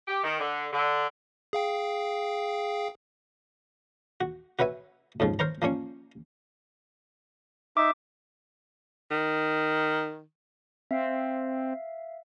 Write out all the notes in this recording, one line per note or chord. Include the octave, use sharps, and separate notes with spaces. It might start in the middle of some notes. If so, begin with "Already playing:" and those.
G4
D#3
D3
D3
G#4 F5 G5
F#4
F#4 B4 C#5 E5 G#5
F2 G#2 C#3 F3
A#4 C5 C#5 A#5
F3 A#3 C#4 C#5
D#4 E5 D6
D#3
C4 E5 F5 C7